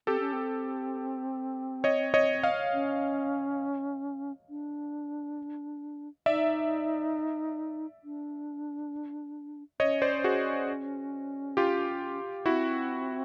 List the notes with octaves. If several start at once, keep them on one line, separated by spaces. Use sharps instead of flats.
C4 G4 A4
C#4
C4
C#5 D#5
C#5 D#5
D#5 F5
C#4
D4
D#4 D5 E5
D4
C#4 C#5 D#5
C5 D5
F#4 G#4
F4 G4
C4 E4 F#4